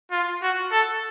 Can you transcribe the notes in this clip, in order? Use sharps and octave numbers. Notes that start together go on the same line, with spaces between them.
F4
F#4
A4